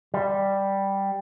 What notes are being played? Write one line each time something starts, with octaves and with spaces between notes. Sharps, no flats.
G3